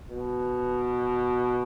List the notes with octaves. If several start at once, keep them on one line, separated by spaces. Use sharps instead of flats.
B2